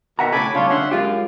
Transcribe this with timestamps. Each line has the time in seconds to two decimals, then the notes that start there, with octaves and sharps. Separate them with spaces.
0.19 B2 D#3 E5 F#5 A#5
0.32 A2 C#3 A4 G#5 B5 D6
0.55 G2 C#3 D4 F4 C#5
0.70 D3 C#4 E5 F#5 C6
0.91 F#2 G#3 F4 G4